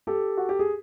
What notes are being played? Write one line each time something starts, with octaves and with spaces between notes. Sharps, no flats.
G4 A4
F#4
G4
G#4